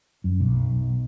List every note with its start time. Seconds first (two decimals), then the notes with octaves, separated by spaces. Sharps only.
0.24 F#2
0.40 B1